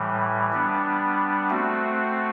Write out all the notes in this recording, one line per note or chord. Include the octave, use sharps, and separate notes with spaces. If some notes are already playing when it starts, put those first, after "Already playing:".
Already playing: A2 E3 G3
G3 B3 D4
A3 C4 F#4